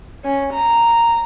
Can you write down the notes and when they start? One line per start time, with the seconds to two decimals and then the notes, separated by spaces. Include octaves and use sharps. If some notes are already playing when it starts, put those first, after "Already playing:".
0.25 C#4
0.54 A#5